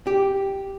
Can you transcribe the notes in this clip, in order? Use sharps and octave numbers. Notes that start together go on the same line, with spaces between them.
G4